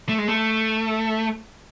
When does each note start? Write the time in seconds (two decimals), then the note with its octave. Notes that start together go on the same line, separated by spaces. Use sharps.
0.09 A3
0.18 G#3
0.29 A3